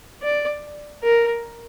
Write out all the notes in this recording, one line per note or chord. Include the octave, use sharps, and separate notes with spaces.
D5
A#4